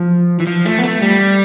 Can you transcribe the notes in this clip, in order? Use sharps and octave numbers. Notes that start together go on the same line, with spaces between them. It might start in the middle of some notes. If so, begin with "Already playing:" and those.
Already playing: F3
E3
F3
A3
B3
A3
G3